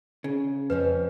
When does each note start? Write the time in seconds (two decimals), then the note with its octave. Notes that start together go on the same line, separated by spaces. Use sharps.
0.24 C#3
0.70 F2 C4 C#4 B4